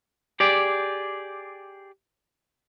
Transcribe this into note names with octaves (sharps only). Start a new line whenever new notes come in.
G4 G#4 D5